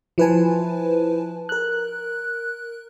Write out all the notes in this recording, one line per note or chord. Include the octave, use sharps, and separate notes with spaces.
F3 E4 B4 C5 G#5 A5
A#4 F#6